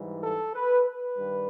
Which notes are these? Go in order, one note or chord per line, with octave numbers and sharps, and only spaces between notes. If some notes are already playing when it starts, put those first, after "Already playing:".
Already playing: G#2 E3 G3
A4
B4
B4
G2 D#3 G3